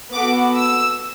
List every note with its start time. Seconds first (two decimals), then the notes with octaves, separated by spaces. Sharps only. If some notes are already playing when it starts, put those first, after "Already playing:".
0.13 B3 F#4 A4 D6
0.58 E6